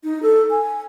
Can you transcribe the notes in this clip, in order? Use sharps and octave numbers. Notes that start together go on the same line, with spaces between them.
D#4
A4
G#5